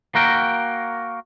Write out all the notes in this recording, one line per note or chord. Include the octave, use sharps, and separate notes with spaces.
A#3 F#4 A#4 G5